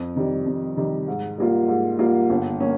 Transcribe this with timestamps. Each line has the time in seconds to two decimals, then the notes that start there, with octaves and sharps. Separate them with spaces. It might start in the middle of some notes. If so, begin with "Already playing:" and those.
Already playing: F2
0.15 C3 D#3 G3
0.46 F2
0.77 C3 D#3 G3
1.08 G#2
1.38 G3 A#3 F4
1.68 G#2
1.99 G3 A#3 F4
2.30 G1
2.60 A#3 C#4